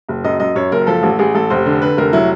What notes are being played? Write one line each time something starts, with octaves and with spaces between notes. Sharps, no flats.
F#1
F#2 D#5
F#2 D#5
F#2 C#5
F#1 A#4
F3 A4
A1
A1 G#4
A1 A4
F1 C5
D3
D3 B4
F1 A#4
F#3 E4